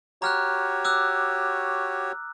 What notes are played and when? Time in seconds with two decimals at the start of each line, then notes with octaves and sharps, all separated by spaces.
0.22 F#4 G4 C#5 A#5 F6 F#6
0.85 D6 E6 F#6